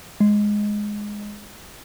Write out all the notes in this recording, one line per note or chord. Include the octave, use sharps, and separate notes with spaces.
G#3